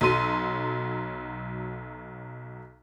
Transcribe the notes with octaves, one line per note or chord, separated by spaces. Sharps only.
B1 F#3 A4 C6 D#7